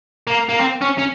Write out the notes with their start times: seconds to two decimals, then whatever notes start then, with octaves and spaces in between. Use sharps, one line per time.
0.27 A#3
0.49 A#3
0.59 C4
0.81 C#4
0.98 C#4